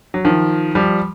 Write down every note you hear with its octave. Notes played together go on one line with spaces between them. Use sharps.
F#3
D#3 F3
F3 G3